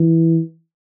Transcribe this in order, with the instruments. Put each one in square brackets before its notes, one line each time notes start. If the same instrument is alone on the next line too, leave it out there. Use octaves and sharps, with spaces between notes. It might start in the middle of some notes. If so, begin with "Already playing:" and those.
Already playing: [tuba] E3